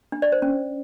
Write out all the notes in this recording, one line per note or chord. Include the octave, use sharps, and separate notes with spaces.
D4
D5
C5
C#4